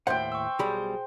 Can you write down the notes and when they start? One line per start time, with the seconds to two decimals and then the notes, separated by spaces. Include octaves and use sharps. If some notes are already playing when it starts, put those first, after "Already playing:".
0.07 D#2 A2 C5 E5 F#5 G5
0.32 C#6 E6
0.59 B1 G3 G#4 B5